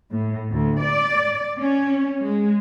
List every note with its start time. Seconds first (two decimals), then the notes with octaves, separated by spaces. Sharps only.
0.11 A2
0.51 D2
0.82 D5
1.58 C#4
2.22 G#3